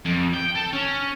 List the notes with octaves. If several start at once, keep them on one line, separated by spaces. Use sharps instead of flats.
F2
G5
A4
C#4